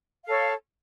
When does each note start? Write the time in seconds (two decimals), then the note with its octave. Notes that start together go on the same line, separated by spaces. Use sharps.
0.24 F5
0.27 A4
0.30 C#5